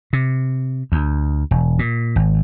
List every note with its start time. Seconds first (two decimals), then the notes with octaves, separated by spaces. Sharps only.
0.13 C3
0.92 D2
1.51 E1
1.79 A#2
2.16 G#1